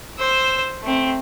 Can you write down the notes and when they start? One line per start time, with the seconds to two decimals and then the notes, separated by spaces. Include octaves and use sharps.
0.18 C5 E6
0.83 A3 C4